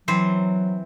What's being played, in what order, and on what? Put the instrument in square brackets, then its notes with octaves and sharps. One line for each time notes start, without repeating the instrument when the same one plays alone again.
[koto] E3 C4 C5 [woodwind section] F#3